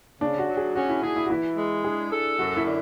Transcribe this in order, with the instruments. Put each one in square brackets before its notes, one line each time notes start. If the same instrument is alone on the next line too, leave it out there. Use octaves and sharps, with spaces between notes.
[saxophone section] C#3 [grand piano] D4
[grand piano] F#4
[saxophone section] F#3
[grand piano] G#4
[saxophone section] C#4 [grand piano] F#4
[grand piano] E4
[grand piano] E4 [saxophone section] G#4
[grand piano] E4
F#4
[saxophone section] E3 [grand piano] E4
[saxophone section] G#3
[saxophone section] D4 [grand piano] G#4
[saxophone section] A4
[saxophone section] F#2 [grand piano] F#4
[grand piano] E4
[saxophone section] D3